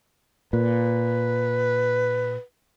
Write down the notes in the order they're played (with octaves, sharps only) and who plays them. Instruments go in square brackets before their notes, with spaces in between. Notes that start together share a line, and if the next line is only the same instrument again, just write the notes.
[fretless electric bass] A#2 [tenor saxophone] B4